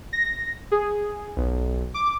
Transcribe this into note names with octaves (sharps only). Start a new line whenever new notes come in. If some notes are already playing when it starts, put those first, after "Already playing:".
A#6
G#4
B1
D6